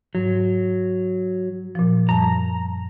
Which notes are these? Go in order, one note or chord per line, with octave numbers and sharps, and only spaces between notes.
G#2 F#3
A#2 F3
F#2 G3 A5 A#5